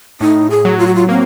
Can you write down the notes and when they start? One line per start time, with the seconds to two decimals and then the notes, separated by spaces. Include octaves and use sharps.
0.20 A2 D#4
0.51 G#4
0.65 F#3
0.79 F4
0.87 F#4
0.95 F4
1.09 A#3 C4